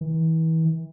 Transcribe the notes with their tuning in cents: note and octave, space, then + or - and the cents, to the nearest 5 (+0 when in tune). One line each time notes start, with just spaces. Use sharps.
E3 -35